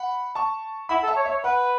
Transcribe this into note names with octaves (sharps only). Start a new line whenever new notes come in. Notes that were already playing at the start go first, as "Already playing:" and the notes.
Already playing: F#5 B5
A5 C#6
E4 F#5 B5
A4
E5 A5
C#5
E5
C#5
B4 F#5